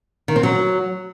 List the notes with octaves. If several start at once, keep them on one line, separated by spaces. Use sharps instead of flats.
D#3
C4
F#3